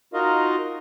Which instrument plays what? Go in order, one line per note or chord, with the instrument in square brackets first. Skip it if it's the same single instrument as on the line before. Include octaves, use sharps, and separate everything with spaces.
[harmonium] D#4 F4 F#4 A#4 D#5 F5